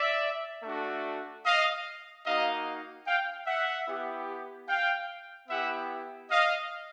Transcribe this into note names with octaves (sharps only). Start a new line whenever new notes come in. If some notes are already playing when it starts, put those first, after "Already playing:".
Already playing: D5 E5
A3 D4 F#4
D#5 F5
A#3 D#4 F#4 D#5 F5
F5 G5
E5 F#5
B3 E4 G4
F5 G5
B3 E4 G4 E5 F#5
D#5 F5